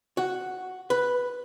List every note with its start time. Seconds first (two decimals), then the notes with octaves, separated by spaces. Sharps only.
0.17 F#4
0.90 B4